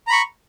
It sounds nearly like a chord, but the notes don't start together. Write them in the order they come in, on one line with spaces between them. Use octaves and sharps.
A#5 B5 C#6